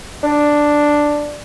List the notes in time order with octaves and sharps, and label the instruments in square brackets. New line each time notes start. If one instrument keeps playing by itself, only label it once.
[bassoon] D4